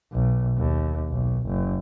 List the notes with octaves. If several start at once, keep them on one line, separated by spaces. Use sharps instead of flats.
B1
D#2
B1
F#1